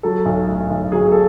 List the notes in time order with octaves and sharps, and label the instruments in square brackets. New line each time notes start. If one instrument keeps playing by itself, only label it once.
[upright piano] F#3 A4
B1
A2
B1
F#3 G#4
A4